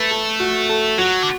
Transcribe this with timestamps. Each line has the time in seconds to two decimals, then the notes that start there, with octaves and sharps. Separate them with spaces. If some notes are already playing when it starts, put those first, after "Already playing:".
Already playing: A3 B4
0.11 A4
0.40 F#4
0.69 A4
0.98 F#3 F#4
1.23 D3